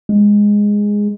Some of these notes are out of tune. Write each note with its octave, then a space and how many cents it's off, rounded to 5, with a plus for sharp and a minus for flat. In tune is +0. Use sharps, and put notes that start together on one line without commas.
G#3 -10